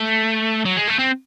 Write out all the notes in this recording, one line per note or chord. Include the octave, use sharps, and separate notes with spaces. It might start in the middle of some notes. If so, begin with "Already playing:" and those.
Already playing: A3
F#3
G#3
A3
C4